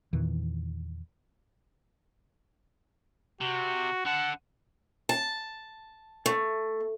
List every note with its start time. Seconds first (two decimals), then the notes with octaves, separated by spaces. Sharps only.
0.13 E2 A#2 D#3 E3
3.41 C3 F#4
4.05 D3 F#5 A5
5.09 A5
6.26 A3